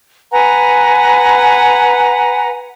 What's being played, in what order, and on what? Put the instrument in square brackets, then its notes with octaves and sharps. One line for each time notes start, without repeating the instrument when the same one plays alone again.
[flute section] B4 F#5 G#5 A#5